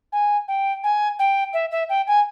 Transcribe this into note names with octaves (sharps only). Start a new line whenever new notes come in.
G#5
G5
G#5
G5
E5
E5
G5
G#5